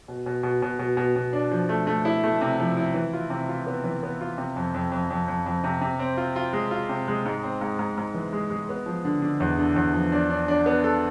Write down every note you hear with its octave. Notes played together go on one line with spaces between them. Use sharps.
B2
B2
B2
B2
B2
B2
B2
D4
F3
A3
A3
E4
A3
C3
F3
E4
E3
F4
C3
F4
B3
E3
B3
F4
C3
F2
F2
F2
F2
F2
F2
C3
C3
C4
F4
F4
G#3
F4
C3
G#3
G#2
C4
G#2
G#2
G#2
E3
G#3
G#3
B3
F3
D3
D3
E2
D3
E2
F3
D4
D4
D4
B3
A4